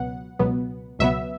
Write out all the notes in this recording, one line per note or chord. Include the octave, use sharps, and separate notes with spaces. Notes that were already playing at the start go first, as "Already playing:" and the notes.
Already playing: C#2 B2 F#3 B3 F#5
C#2 B2 F#3 B3
C#2 B2 F#3 B3 E5